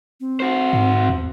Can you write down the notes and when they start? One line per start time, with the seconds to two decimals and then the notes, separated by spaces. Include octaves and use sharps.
0.20 C4
0.40 F#4 C5
0.73 G#2
1.10 E2